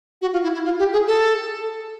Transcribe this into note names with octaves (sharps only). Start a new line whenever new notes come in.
F#4
F4
E4
E4
F4
G4
G#4
A4